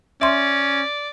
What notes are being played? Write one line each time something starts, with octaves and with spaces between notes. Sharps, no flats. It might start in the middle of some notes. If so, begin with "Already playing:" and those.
C#4 D5 E5 C6